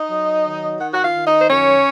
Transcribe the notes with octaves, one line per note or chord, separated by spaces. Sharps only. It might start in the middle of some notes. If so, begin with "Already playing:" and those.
Already playing: D#4 D#5
F#3
D#3
D#3 F#5
F#4 F#5
F4 F5
D#3
D#4 D#5
C5
F#2 C#4 C#5